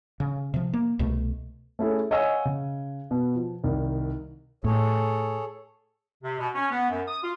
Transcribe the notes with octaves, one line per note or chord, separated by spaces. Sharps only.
C#3
C3 F3
A#3
C2 B2 A3
A3 C#4 E4 G#4 A4
C#5 D#5 F5 F#5 G#5 E6
C#3
B2
F3
C2 D#3
A2 G#4 A4 C#5
C3
B2
C#4
B3
F#2
D#6
F4